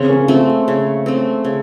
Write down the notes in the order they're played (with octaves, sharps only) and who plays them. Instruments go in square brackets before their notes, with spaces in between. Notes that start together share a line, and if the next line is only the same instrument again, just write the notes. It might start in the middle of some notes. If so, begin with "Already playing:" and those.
Already playing: [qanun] C#3 [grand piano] C4
[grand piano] A#3 C#4
[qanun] A3 C4 [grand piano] C#4 F4
[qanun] C#3
A3 C4
C#3